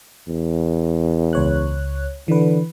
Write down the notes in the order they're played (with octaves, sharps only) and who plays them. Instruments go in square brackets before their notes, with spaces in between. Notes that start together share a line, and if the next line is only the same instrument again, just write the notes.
[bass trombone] E2
[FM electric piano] C#2 C#5 F#6
[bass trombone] D3 [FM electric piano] E3 B4